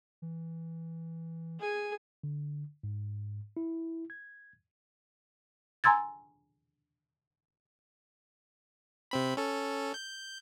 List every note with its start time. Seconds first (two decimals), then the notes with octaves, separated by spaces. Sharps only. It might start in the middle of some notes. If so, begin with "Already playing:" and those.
0.22 E3
1.60 G#4 G#5
2.24 D3
2.83 G#2
3.57 E4
4.10 G#6
5.84 G#5 A#5 C6 E6 G#6 A6
9.11 C3 C4 B5
9.37 C#4 A4
9.94 G6